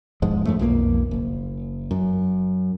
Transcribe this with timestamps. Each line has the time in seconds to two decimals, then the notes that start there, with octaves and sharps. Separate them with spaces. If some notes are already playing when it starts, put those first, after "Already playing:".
0.22 E1 G#2 F3 G#3
0.46 F#2 F3 A3
0.59 B1 F2 D#3 A#3
1.11 F#1
1.91 F#2